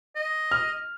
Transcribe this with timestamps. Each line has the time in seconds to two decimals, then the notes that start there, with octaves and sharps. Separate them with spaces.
0.16 D#5
0.51 F6